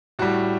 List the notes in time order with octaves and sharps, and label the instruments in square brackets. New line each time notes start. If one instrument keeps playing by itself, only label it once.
[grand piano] A2 G3 F#4